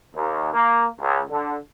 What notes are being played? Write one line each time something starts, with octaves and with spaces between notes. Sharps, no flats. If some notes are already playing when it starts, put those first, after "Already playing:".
D#2
A#3
C#2
D3